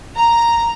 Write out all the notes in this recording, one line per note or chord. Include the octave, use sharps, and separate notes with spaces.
A#5